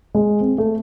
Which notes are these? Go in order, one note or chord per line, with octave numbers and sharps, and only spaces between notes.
G#3
C4
A3